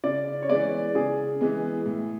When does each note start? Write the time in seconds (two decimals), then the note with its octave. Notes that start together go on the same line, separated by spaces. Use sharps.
0.04 C#3 D5
0.42 C#5
0.49 E3 G#3 B3 D5
0.95 C#3 G#4
1.41 E3 G#3 B3
1.86 A2